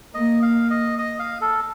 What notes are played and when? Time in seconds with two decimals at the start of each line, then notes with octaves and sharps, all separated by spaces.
0.14 A#3 D#5
0.42 F5
0.70 D#5
0.98 D#5
1.19 F5
1.41 A4